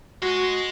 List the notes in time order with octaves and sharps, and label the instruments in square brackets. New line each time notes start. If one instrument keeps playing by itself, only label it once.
[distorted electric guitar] G#3 [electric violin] F#4